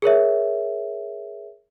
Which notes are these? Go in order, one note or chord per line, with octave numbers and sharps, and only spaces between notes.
G#4 A#4 C#5 E5